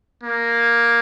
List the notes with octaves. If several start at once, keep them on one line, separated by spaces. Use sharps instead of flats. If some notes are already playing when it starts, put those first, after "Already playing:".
A#3